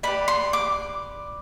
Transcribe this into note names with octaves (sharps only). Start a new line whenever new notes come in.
G4 B4 D5 B5
C6
D6